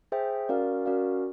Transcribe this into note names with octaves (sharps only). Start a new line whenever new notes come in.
G#4 C5 E5 G5
C#4 F#4 A#4 D5 F5
C#4 F#4 A#4 D5 F5